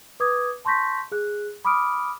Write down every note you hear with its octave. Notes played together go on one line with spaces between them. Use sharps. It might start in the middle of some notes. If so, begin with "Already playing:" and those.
B4 D6 D#6 G#6
A5 C6 C#6 G6 A#6 B6
G#4 F#6
B5 D6 D#6 F6 D7